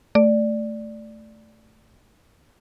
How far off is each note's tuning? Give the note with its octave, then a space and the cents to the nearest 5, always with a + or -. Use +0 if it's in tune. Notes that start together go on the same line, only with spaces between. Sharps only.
A3 +0 D5 +0